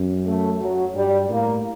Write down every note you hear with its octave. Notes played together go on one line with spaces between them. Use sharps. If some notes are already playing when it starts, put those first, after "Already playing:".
Already playing: F#2
A3
F#3
G2 G3
A2 A#3